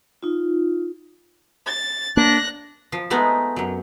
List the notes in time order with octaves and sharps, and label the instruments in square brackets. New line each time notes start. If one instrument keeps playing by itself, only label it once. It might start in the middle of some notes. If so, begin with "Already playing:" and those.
[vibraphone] D#4 F4
[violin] A6
[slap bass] A#3 [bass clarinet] D4 [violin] F#6 A#6
[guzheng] F3
G#3 A3 B3 D#4
F#2 F#3